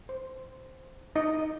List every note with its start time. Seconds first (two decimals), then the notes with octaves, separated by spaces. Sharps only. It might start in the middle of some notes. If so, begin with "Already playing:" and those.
0.09 C5
1.16 D#4 D#5